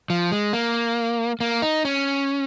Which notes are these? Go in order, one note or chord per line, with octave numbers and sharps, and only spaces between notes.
F3
G#3
A#3
A#3
D#4
C#4